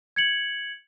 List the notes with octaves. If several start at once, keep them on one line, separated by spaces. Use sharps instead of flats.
G#6 C#7 F#7